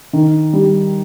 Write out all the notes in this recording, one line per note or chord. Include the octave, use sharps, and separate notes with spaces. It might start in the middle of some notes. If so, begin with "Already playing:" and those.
D#3
G3